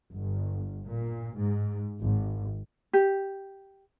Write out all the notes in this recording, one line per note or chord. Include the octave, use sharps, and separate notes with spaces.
G1
A#2
G#2
G#1
G4